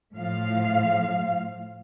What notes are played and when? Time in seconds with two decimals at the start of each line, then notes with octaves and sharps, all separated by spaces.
0.14 A2 F3 F5